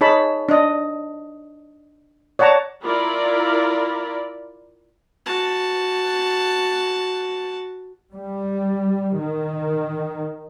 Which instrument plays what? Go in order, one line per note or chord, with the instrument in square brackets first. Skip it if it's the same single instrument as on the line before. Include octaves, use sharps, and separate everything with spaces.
[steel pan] D#4 G#4 C#5 A5 B5
D4 D#5
C#5 D5 F#5 A5 A#5
[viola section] E4 F4 A#4 D5 B5
[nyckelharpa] F#4 A5
[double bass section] G3
D#3